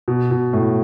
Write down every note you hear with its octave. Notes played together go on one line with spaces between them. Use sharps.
B2
B2
A2